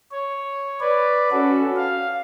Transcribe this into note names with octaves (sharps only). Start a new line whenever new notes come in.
C#5
B4 D5
C#4 F#4 A4
F5